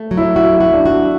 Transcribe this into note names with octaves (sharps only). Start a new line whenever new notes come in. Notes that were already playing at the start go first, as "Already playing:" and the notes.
Already playing: A3
F#3
E4
E4 F#4
F#4
D4
F#4